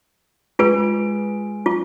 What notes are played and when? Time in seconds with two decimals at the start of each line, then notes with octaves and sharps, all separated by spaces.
0.59 G#3 F4 B4 D7
1.66 F4